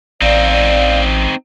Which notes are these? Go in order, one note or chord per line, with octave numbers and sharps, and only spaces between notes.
A1 C4 D#4 D5 F5